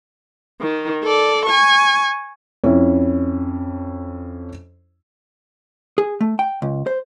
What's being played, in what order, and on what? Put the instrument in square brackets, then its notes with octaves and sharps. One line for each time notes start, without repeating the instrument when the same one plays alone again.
[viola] D#3
A4 D5
G#5 C#6
[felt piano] F2 C#4 E4
[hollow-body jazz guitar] G#4
A3
G5
C#2
C5